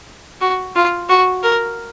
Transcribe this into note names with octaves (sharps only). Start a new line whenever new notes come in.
F#4
F4
F#4
A#4